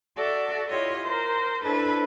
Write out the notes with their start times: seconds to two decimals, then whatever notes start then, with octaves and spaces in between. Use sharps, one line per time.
0.17 F#4 A4 D5 E5
0.69 E4 F4 G4 C#5 D#5
1.05 A#4 C5
1.62 D4 E4 A4 B4 C5